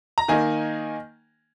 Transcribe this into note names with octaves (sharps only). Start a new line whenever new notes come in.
A#5
D#3 A#3 D#4 G#5